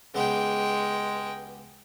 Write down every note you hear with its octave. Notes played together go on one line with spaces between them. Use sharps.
C#2 G#3 B3 G4 G5